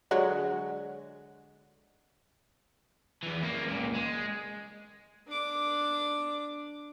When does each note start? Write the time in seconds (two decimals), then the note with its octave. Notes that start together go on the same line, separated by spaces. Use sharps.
0.11 D3 F#3 G#3
3.23 E2 E3
3.43 A#3 C#4
3.68 C#2 A#2
3.94 G#3
5.27 D4 D6